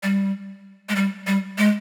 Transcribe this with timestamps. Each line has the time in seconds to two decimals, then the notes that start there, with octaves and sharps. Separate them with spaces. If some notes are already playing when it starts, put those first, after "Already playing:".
0.03 G3
0.89 G#3
0.96 G3
1.27 G3
1.58 G#3